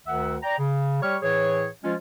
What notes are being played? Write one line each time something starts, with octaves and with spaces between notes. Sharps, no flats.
D2 D#3 E5 F#5
D5 G5 A#5
C#3
G3 G4 C#5 C#6 F6
A2 E3 G#4 C#5
F3 G#3 C#4 F4